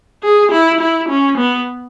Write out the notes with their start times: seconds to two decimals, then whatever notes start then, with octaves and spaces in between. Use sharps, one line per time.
0.23 G#4
0.52 E4
0.81 E4
1.09 C#4
1.38 B3